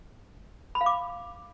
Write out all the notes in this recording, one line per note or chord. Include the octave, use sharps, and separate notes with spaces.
B5
F5
D6